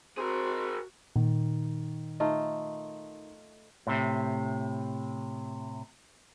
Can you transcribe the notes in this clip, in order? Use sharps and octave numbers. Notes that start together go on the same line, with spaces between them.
C4 F#4 G#4 A#4
A#2 D#3
A3 D#4 F4
A2 C3